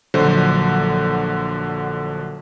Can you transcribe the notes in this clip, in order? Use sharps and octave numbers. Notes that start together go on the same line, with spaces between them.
A#1 D3 F#3 C5